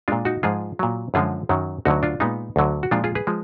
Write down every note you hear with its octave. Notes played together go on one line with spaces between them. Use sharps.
A#2 G#3 D4 F4
D#4 F#4
G#2 F3 G#3 F4 G#4
A#2 F#3
F#2 D3 F3 G#3 F4 G#4
F#2 D#3 F#3
D2 D3 F#3 D#4 F#4
D4 F4
A#2 G#3 B3 D#4
D2 D3 F#3
F#4
A#2 F3 G#3 D4 F4
F4 G#4
G#4 B4
F3 G#3